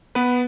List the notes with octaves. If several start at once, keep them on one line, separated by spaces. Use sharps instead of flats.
B3 B4